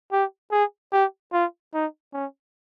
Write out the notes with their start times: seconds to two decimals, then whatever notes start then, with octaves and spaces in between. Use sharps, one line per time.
0.12 G4
0.52 G#4
0.92 G4
1.33 F4
1.74 D#4
2.13 C#4